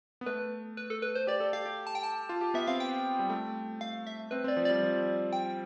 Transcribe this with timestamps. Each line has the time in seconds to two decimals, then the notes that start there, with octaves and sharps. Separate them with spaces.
0.21 B3
0.26 A3 B4
0.77 B4
0.90 A4
1.02 B4
1.15 C5
1.27 G4 D5
1.40 A4
1.53 G4 F5
1.66 G4
1.87 A5
1.95 G5
2.03 A5
2.29 F4
2.41 G4
2.54 B3 E5
2.67 C4 F5
2.80 G5
3.19 G3
3.30 A3
3.81 F5
4.07 E5
4.31 C4 B4
4.44 C4 D5
4.57 F3
4.65 G3 D5
4.83 F3
5.33 G5